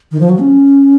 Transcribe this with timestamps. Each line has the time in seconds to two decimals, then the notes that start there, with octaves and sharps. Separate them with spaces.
0.12 D#3
0.20 F3
0.30 F#3
0.39 C#4